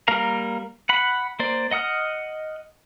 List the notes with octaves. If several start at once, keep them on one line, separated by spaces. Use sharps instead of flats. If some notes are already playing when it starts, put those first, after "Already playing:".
G3 A#3 A#4 F5 A#5
F#5 B5
A#3 C5 D5
D#5 F#5 D#6 F6